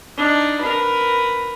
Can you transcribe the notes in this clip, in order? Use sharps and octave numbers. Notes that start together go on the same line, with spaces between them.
D4 D#4
A#4 B4